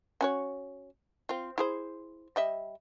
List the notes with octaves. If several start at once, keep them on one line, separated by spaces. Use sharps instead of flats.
C#4 F#4 C#5
C4 F4
E4 G#4 C5
G3 D#5 E5